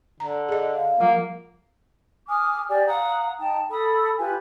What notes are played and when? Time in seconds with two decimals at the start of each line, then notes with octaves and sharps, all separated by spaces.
0.20 D3 A#5
0.49 G#4 D#5
0.76 F5
1.00 F3 G3 A#3 F4
2.26 G#5 D6 D#6 F6
2.68 G4 D5 G#5
2.86 F5 F#5 A#5 D#6
3.39 D#4 G5 A5
3.69 A4 B5 D#6
4.18 F4 G4 B4 G#5